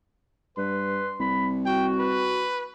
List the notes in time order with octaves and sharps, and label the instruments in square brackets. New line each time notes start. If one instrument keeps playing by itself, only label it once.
[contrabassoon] G2 [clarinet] B4 [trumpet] C6
[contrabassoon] C2 [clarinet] B5
[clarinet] F#4 [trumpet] G5
[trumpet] B4